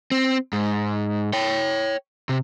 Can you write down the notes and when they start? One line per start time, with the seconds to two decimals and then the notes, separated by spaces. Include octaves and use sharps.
0.11 C4
0.53 G#2
1.33 C#5 G5
2.29 C3